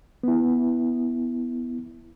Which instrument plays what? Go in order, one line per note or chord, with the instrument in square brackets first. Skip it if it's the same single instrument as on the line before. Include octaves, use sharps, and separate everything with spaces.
[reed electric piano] B3 E4